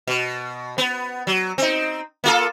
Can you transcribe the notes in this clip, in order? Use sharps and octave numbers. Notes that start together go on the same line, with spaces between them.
B2
B3
F#3
C4 D#4
A#3 F4 A4